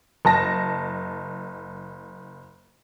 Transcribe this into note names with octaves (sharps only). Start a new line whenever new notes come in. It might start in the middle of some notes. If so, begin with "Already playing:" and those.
F#1 A5 A#6